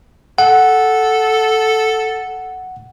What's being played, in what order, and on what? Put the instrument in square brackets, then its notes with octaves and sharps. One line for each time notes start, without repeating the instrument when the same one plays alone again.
[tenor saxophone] A4 [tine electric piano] F#5